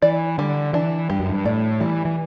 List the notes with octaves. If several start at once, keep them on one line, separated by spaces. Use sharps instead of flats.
E3 D5
D3 G3
E3 D4
G2 G4
F#2
G2
A2 D5
E3 G3
E3